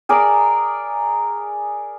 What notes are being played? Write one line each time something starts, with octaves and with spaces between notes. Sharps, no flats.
G#4 A#4 D5